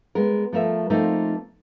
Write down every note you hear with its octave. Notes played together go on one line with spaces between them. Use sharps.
G#3 B3 A#4
F3 A3 A#4 E5
F3 A3 A#3 C4 D#4 A#4